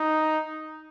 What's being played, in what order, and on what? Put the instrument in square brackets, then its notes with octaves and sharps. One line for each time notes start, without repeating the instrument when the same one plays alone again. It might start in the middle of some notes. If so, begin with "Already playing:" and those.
Already playing: [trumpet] D#4